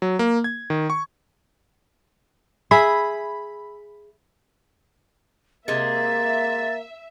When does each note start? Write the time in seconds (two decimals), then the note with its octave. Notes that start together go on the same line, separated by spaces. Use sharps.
0.02 F#3
0.19 A#3
0.44 G#6
0.70 D#3
0.90 C#6
2.71 G#4 E5 B5
5.68 C3 G#3 A#3 E5 A6